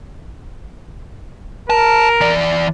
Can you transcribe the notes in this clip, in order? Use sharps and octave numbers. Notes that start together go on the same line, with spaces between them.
A#4 A5
E3 D5